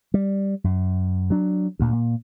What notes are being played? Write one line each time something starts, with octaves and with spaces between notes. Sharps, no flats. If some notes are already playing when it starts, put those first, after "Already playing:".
G3
F#2
F#3 D4
D2 A#2
A#2